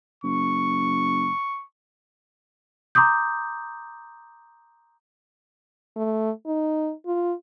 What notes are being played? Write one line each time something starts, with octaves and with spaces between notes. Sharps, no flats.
F#1 C#6
A#5 C6 D6 D#6 G6
A3
D#4
F4